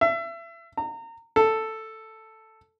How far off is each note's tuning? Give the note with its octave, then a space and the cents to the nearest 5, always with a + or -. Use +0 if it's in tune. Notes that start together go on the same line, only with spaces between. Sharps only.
E5 +30
A#5 -30
A4 +5